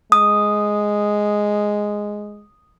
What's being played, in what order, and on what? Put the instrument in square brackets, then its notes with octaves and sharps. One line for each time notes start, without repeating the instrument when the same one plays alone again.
[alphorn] G#3 [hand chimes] D#6